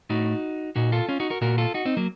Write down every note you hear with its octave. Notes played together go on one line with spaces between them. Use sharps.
A2 D#4 F#4
A#2 D#4 F#4
F4 A4
C#4 F4
D#4 F#4
F#4 A#4
A#2 F#4 A#4
F4 A4
D#4 F#4
C4 D#4
F#3 A#3